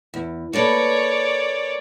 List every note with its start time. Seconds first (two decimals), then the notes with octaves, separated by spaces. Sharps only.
0.14 E2
0.53 A#3 A4 B4 C#5 D5